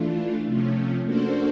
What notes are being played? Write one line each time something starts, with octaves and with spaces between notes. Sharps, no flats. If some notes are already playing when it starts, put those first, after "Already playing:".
Already playing: E3 A3 D4 F4
C3 F3 A3 C#4
A#3 D4 F#4 A4 C5